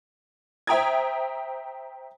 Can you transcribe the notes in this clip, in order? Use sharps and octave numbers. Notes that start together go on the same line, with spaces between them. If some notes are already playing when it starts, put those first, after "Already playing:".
C5 E5 G5 A#5 D#6 G#6